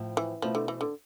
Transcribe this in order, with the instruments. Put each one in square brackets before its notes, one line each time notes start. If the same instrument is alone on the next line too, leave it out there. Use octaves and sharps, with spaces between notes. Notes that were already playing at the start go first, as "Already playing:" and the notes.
Already playing: [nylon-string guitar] A2 F3 C4 E4
[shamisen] E3
[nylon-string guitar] B2 A3 C4 E4 [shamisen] F3
[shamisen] D3
E3
D3